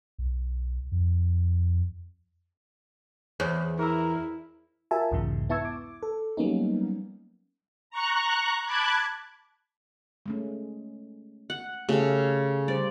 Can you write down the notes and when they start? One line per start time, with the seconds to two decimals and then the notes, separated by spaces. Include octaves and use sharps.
0.18 B1
0.92 F2
3.40 E2 G#4 C5 C#5
3.79 E4 G#4 A#4 A#5 E6
4.91 F4 F#4 A#4 E5 G#5 A5
5.11 B1 E2 G#2 C#3 G#3
5.49 B3 E4 A5 C#6 E6 G#6
5.65 D6
6.03 A4
6.37 F#3 G3 A#3 B3 C#4 D#4
7.90 A#5 C#6 F#6
8.65 A5 B5 D6 F#6 G#6
10.26 G#3 A3 C#4
11.50 F#5
11.89 C#3 A3 G4 A4 F5
12.68 G3 C5 D5